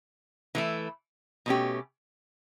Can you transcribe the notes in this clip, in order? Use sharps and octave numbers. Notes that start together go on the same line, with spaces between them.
E3 A3 E4
B2 A3 C#4 G4